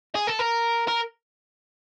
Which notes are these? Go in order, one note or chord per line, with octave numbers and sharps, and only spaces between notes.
G#4
A4
A#4
A#4